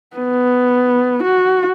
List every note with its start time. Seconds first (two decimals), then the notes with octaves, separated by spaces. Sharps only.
0.17 B3
1.23 F#4